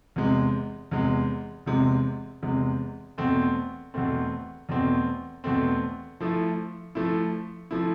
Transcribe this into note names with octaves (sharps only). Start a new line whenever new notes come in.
E2 C3 G#3
E2 C3 G#3
E2 C3 G#3
E2 C3 G#3
E2 B2 A3 C4
E2 B2 A3 C4
E2 B2 A3 C4
E2 B2 A3 C4
F3 A3 E4
F3 A3 E4
F3 A3 E4